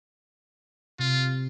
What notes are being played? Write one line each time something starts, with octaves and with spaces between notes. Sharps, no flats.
C3 F4